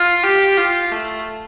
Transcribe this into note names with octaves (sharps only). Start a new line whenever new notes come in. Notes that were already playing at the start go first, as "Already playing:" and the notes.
Already playing: F4
G4
F4
A3